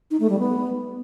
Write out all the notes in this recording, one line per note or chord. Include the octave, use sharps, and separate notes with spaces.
D#4
A3
G3
B3